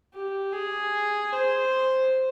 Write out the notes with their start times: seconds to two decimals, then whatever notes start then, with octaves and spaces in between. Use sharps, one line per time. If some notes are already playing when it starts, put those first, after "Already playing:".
0.14 G4
0.53 G#4
1.32 C5